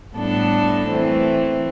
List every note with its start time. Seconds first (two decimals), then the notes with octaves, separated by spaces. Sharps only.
0.16 A2 G3 B3 D4 A4
0.89 E3 A3 C4